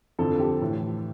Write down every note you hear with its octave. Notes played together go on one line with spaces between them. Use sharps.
F2 D3 F3 A4
G4
A2 E3